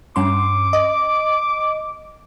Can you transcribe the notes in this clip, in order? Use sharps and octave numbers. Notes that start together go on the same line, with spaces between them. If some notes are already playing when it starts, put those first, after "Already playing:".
G2 C#4 C6 D6
D#5